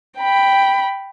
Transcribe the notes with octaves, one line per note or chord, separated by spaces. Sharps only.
G5 B5